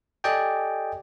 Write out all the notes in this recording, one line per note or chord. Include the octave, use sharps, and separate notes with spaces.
G4 A4 D5 D#5 G5 G#5